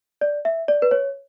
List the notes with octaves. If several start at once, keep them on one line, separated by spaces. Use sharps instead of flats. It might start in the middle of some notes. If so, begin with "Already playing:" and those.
D5
E5
D5
B4
C#5